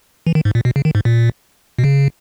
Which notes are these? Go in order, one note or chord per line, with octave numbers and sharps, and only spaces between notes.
E3
D#3
G#2
A#2
B2
C#3
D#3
G#2
A#2
B2
C#3